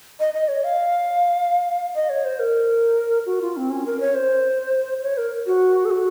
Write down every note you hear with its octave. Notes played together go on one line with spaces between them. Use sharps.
D#5
D#5
C#5
F5
D#5
C#5
C5
A#4
F#4
F4
C4
C#4
A#4
C#5
C5
C#5
A#4
F#4
A4
F#4